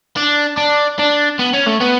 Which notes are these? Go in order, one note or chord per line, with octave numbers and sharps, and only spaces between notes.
D4
D4
D4
B3
C#4
A3
B3